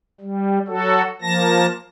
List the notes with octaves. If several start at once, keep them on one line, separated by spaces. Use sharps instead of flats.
G3
F#3 F#4 A4
F3 A#3 A5 A#6